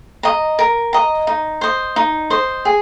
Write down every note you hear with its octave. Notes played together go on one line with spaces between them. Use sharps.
D#5 A#5
A#4
D#5 A#5
D#4
C5 D#5
D#4
C5 D#5
G#4